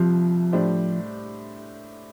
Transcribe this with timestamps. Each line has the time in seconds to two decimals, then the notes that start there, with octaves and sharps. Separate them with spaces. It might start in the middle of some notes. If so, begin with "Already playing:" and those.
Already playing: C2 C3 F3 G3
0.53 A2 G3 D4 G4 C5